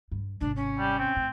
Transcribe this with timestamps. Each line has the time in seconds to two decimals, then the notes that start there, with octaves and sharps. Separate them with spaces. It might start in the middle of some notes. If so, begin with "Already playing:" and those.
0.11 G2
0.41 G#1 C3 D4
0.56 C#4
0.79 G3
0.99 C4
1.16 A2